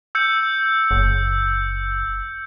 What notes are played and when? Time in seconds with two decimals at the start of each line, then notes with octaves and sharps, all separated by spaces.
0.15 E6 G6 C#7
0.91 F#1